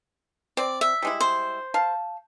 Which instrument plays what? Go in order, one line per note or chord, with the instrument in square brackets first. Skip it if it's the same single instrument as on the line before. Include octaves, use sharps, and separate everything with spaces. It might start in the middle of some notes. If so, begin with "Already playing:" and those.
[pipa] C4 [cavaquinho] D5
[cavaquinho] E5
[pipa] G3 G#3 E4
[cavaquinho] C5
[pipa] F5 A5